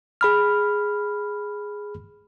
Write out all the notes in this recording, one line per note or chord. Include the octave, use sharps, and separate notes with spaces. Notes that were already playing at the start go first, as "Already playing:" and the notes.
G#4 B5 F6